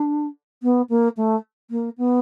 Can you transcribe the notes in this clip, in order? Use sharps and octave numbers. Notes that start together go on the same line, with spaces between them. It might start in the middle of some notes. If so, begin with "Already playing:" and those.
Already playing: D4
B3
A#3
A3
A#3
B3